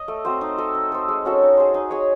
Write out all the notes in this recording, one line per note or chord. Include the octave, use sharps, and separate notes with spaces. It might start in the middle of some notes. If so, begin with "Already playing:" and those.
Already playing: D#5
A3
C4 F#4 C5
D#4
A4 D#5
D#4
A4 C5
G#3
C#4 F#4 A4
D#4
G#4 C5
D#4
G#4 C#5